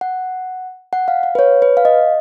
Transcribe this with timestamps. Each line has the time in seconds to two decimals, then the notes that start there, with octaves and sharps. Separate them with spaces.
0.01 F#5
0.93 F#5
1.08 F5
1.23 F5
1.35 B4
1.39 C#5
1.62 B4
1.77 F5
1.85 D#5